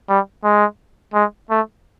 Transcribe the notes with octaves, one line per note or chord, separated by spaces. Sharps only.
G3
G#3
G#3
A3